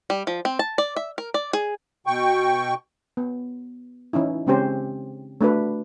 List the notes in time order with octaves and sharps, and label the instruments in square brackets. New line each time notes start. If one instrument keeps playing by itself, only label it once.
[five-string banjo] G3
F3
C4
A5
D5
E5
A#4
D5
G#4
[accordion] B2 G5 C#6
[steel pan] B3
E3 C#4 D#4 E4
C#3 G#3 C4 C#4 G4 C5
A3 D4 F#4 B4